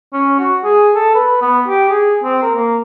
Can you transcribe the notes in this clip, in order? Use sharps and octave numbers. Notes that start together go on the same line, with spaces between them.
C#4
F#4
G#4
A4
B4
B3
G4
G#4
C4
A#4
A#3